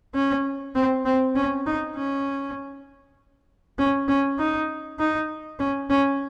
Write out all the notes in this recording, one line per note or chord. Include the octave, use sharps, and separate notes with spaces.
C#4
C4
C4
C#4
D#4
C#4
C#4
C#4
D#4
D#4
C#4
C#4